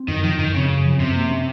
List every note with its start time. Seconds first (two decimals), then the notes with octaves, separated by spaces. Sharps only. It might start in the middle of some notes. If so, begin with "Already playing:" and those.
Already playing: C4
0.08 F#2 D#3
0.24 D#3 F3
0.39 F#2 D#3
0.54 C#3 C4
0.69 F#2
0.85 F3
1.00 F#2 C3
1.15 A#3
1.31 C#4